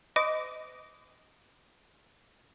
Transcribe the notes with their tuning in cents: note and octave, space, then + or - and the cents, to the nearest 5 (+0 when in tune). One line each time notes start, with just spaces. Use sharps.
B4 +45 D#5 +0 D6 -20